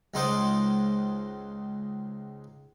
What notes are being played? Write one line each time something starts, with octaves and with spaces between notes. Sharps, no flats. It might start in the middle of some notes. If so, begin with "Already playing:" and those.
C#2 G#3 D#4 C5 D5 D#5